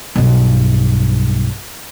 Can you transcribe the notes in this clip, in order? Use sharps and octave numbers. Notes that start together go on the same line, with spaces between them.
B1 G2